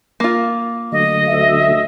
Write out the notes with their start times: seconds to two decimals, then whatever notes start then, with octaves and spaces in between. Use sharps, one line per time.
0.20 A#3 F4
0.92 D3 F#3 A3 D#5
1.28 D2 E5